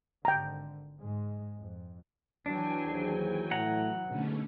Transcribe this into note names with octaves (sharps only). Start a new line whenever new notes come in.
G#1 D3 G5 A#5
G#2 G#3
F2
E3 F#3 D4 G5 G#5
D#2 G#4 C5
A2 F#5 A#5
C#2 G#2 B2 D3 A3 C#4